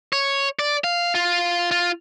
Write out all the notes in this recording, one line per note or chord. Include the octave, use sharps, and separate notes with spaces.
C#5
D5
F5
F4
F4